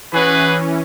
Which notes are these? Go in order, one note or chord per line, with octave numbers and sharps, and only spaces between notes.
E3 C#4 F#4 G#4 B4